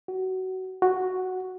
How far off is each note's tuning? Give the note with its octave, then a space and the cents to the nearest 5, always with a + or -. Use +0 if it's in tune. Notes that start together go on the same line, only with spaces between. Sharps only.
F#4 +20
F#4 +0